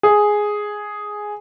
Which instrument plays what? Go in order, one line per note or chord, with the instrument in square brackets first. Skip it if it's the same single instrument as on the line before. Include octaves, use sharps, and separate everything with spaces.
[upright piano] G#4